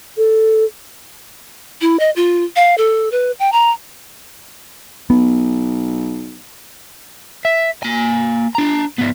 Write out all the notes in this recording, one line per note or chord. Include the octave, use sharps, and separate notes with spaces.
A4
E4
D#5
F4
F5
A4
B4
G5
A#5
B1 B3
E5
A#3 G#5
D4 A#5
F3 B3